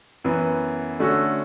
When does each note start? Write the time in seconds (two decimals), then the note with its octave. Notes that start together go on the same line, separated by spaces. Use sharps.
0.24 F#2 E3 B3
1.00 D3 A3 C#4 F#4 A4